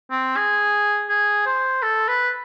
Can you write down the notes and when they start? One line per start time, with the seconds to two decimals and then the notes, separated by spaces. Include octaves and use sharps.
0.11 C4
0.37 G#4
1.10 G#4
1.46 C5
1.83 A4
2.08 B4